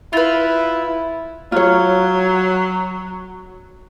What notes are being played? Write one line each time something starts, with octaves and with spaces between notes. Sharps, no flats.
E4 F4 B4
F#3 F4 C#5